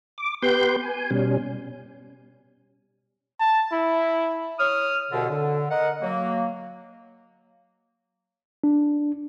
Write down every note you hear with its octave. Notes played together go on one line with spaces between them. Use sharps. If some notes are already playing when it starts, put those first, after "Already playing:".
D6
B3 G4 B4 C6 G6
G#5
B2 G3 C#4
A5
E4
C#5 D#6 F6
C2 B2 D3
D3
A#4 D#5 F#5
F#3 A#3
D4